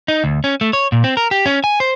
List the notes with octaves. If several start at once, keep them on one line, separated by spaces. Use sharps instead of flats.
D#4
D2
C#4
A3
C#5
A#2
C4
A#4
G4
C#4
G#5
C5